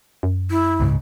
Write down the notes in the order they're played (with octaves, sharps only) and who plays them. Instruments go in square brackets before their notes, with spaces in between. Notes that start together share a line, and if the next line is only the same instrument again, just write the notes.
[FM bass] F#2
[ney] E4
[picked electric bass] C#2 G#2 C#3